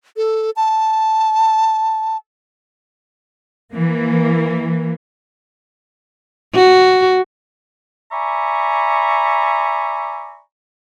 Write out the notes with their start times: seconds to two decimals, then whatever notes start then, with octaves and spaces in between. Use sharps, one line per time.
0.17 A4
0.56 A5
3.72 E3 A#3
6.54 F#4
8.12 D5 E5 G#5 A#5 B5 C#6